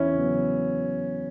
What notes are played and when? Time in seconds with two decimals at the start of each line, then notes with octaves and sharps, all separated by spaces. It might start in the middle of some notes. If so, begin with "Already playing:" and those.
Already playing: E2 C#4 E4
0.14 C#3 F#3 B3